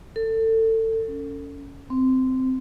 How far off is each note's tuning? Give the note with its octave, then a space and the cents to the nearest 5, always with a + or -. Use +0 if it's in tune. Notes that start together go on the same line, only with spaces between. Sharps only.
A4 +25
C#4 +20
C4 -15